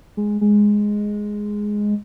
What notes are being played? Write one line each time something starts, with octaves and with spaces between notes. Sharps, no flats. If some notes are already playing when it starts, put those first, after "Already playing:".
G#3
G#3